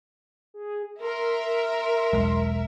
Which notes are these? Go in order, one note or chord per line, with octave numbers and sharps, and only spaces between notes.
G#4
A#4 E5 C6
E1 B1 G#3